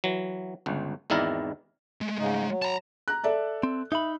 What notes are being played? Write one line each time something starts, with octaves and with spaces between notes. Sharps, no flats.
E3 F#3
G1 C#2
G#1 E2 D#3 E4 A#4 D5
G#3 A3
G#2 C#3 D#4
F#3
A5 A#5
A#5 F#6
A4 D5 E5
C4
D#4 E5 B5